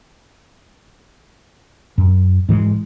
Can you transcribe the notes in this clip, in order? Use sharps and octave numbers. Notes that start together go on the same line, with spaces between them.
F#2
G#2 E3 F#3 G#3